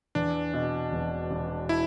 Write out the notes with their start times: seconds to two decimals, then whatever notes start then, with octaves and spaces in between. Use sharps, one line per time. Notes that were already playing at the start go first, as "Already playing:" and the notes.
0.15 E2 D4
0.54 B2
0.92 E1
1.31 E1
1.69 E4